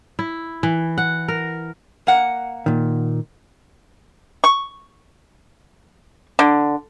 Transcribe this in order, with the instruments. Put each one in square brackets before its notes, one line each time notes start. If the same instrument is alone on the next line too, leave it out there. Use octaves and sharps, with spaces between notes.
[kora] E4
E3
F#5
A#4
[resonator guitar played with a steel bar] A#3 F#5
[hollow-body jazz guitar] A#2 D#3
[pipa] C#6
D3